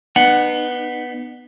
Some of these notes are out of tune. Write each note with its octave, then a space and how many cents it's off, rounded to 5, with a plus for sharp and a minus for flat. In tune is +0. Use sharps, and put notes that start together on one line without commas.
B3 +0 D#4 -45 F#5 +0